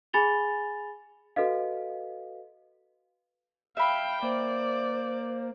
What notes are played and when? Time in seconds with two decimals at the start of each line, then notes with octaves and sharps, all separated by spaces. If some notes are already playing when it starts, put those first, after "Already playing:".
0.13 G#4 G#5 B5 A6 F7 G7
1.36 F#4 A4 B4 D#5 F5
3.77 E5 F5 G5 B5
4.23 A#3 C5 D5